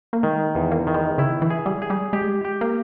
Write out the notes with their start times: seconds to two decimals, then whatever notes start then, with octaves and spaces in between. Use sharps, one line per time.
0.13 A#3
0.23 D#3 G#3
0.55 E2
0.71 A#3
0.87 D#3
0.94 G#3
1.18 C#3 E4
1.42 E3
1.50 G#4
1.66 G3
1.82 G#4
1.90 G3
2.13 G#3 G4
2.45 G4
2.61 A#3